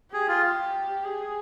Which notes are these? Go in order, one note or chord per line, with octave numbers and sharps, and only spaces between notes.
G4 G#4
F4
G#4